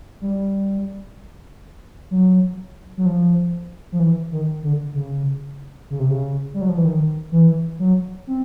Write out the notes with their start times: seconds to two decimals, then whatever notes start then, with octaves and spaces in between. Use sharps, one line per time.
0.21 G3
2.11 F#3
2.97 F#3
3.06 F3
3.92 F3
4.00 E3
4.32 D#3
4.63 D3
4.94 C#3
5.90 C#3
6.00 C3
6.10 C#3
6.54 G3
6.61 F#3
6.69 F3
6.77 E3
6.85 D#3
7.32 E3
7.79 F#3
8.27 C4